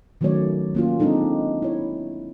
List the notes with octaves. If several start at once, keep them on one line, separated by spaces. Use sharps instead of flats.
D#3 F#3 A3 C#4 C#5 D5
A#3 C#4 F4
G#3 C4 D4 D#4 A4
E4 C#5